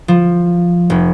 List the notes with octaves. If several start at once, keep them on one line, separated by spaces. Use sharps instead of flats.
F3
F1